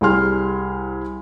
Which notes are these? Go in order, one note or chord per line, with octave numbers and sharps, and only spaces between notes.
C2 G3 G#4 C6 F6